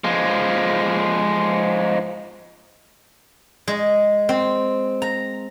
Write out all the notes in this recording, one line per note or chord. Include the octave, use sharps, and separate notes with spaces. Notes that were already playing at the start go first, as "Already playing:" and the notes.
F3 G#3
G#3
C4
A#5